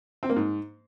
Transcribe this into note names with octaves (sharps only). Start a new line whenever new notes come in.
C4
A#3
G#2